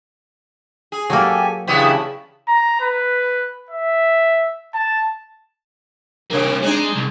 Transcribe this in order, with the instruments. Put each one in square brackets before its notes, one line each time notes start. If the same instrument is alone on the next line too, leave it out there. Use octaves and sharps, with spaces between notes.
[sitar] G#4
[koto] F#3 A#3 [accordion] G4 A4 G#5
[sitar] E2 B3 E4 [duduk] C#3 [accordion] D4 G4
[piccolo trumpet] A#5
B4
E5
A5
[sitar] G2 C3 [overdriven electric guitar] G3 A#3
[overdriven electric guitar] G#3 [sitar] C4 D4 D#4
[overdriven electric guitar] C2